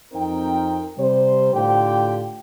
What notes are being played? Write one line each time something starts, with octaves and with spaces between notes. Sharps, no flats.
F2 C4 D#4 A#4 G5
C3 G3 C5
A2 D3 F4 G4 G5